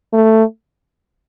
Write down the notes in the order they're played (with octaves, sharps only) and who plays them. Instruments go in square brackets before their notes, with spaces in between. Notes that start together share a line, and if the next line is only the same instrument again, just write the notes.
[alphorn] A3